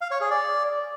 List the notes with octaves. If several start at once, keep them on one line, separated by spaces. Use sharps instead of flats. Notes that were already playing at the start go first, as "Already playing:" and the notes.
F5
C#5
G#4
D5